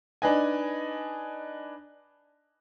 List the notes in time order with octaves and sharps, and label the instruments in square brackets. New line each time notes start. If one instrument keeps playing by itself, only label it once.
[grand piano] D4 D#4 B4 D#5 G#5